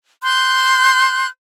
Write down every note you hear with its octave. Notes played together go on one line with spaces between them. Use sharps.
C6 F#6 G6